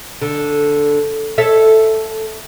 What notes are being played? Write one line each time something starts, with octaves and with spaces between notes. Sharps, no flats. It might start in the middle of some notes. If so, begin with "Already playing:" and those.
D3
A4 C#5 E5